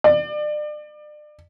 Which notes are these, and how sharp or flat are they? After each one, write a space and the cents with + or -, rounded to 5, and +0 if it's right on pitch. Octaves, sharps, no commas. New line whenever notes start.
D5 +35